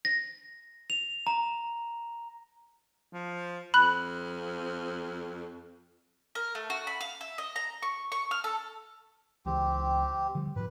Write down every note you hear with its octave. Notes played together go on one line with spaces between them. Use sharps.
A#6
F7
A#5
F3
F2 B5 F#6 F#7
A#4
A3
F#4
B5
F5
E5
D#5
A#5
C#6
C#6
F6
A4
C#2 E3 G#3 C4 G4
D3 F3 G3
G#2 F3 B4